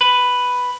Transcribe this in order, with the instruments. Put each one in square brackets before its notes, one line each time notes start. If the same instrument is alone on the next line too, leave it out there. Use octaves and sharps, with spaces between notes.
[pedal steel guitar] B4